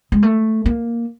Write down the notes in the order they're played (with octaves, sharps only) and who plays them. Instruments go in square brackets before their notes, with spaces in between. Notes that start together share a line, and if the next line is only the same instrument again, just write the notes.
[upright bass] G#3
A3
A#3